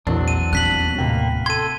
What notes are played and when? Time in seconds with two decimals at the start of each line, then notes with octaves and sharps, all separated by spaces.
0.07 A#1 E2 E3 F#3 C4 D4
0.28 D#7
0.53 D#1 B3 F#6 B6 F#7
0.98 A2 C3 A#3 G5
1.46 A4 C6 G#6 D#7